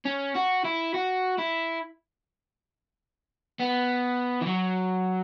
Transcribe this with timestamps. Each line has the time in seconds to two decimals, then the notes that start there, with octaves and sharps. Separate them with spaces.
0.05 C#4
0.35 F#4
0.64 E4
0.94 F#4
1.39 E4
3.60 B3
4.42 E3
4.47 F#3